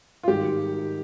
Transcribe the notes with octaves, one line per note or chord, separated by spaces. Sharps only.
F4
G#2 D#3 G3 G4